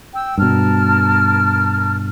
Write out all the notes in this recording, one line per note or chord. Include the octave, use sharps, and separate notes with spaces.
G5 E6
G2 B2 A#4 A5 F6